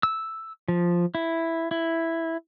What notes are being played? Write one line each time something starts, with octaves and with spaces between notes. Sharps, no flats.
E6
F3
E4
E4